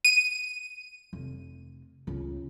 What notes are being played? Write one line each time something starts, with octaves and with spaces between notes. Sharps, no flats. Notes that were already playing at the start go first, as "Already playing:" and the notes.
D#7
F1
C#2 C#3